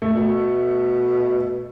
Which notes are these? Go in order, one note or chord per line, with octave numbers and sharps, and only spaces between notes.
A3
B2